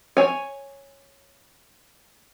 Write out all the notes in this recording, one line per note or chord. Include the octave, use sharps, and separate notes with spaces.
C#5 G#5